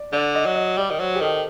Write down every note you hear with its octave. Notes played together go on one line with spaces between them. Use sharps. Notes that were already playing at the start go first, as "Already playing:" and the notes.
Already playing: D5
D3 D5
D#5
F#3
D#5
G3 D5
D#3
F#3 C5
G4
D#3 A4